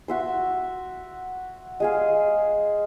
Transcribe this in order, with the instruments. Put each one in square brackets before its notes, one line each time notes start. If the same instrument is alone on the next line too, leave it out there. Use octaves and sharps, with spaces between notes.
[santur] F#4 E5 C6
G#3 G#4 F5